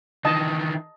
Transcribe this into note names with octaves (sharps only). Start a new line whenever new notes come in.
D#3 E3 D#5 A5